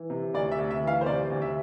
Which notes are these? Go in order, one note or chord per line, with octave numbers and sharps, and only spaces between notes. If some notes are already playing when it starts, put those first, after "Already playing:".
Already playing: E3
C3
D2 D5
E5
D2
E5
E3
F5
C5
C3 D5
D2
E5